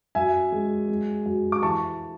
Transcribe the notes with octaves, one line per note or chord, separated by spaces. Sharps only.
F#2 E5 G#5
G#3
G#3
F#2
D6
E3 A5 C#6